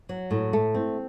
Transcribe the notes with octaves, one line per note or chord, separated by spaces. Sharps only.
F#3
A2
A3
C4